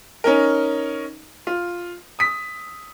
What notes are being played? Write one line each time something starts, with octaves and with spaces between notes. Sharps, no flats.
C#4 D#4 A#4
F4
D#6 B6